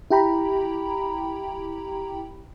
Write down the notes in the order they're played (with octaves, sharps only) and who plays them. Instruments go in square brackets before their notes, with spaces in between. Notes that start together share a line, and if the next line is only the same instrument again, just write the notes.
[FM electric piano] E4 G4 G5 A#5 B5